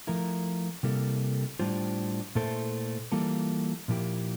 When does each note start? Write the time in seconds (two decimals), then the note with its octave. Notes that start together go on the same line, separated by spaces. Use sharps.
0.07 F3 A3 E4 A#4
0.83 C3 G3 A#3 E4 A4
1.59 A2 G3 D4 F4 C5
2.35 A#2 A3 E4 A4 C5
3.12 E3 G3 A#3 F4 A4
3.88 A#2 F3 A#3 E4 G4